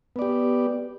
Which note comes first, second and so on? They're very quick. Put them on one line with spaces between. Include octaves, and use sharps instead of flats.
B3 D5 G4